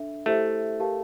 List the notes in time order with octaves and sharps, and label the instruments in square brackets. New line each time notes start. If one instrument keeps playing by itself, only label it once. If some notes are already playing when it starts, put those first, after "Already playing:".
Already playing: [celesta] D4 A4 E5
[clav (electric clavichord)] A3 [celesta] E4 G4 C5 E5
[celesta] G4 A#4 F5 A5